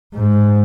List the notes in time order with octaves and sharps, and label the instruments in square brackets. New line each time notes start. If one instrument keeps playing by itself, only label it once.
[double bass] G#2